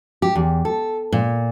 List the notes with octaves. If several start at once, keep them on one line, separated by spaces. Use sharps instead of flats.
G4
E2
A4
A#2